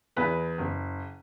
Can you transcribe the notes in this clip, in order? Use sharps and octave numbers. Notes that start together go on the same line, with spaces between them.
E2 B4 B5
F#1